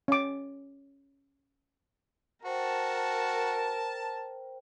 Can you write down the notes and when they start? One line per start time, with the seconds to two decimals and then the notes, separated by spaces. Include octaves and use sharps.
0.08 C#4 D6
2.45 F#4 A#4 C5 G5 A5